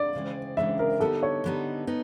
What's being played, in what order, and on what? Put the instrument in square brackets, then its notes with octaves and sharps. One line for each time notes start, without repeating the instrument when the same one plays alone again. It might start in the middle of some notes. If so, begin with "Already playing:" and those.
Already playing: [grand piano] D5
[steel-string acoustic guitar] D2 C#3 E3 G#3 C4
[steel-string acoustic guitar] D2 C#3 E3 G#3 C4 [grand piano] E5
[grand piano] A#4
[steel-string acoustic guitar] D3 G3 B3 D#4 [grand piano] A4
[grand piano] C#5
[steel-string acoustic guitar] D3 G3 B3 D#4
B3 D#4